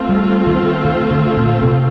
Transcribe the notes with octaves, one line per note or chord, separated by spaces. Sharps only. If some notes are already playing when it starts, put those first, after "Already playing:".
Already playing: A3 C4 F4
G3
D#3
D#3
D3
A#2
C3